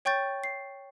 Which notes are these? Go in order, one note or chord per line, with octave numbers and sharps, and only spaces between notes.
C#5 G5 C#6 G6 A6
C7